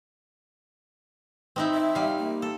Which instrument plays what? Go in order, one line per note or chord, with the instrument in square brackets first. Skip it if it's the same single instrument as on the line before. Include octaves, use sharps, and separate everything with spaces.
[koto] C4 D#4 E4
[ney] E5
[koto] G3 F5
[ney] A#3
[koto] A4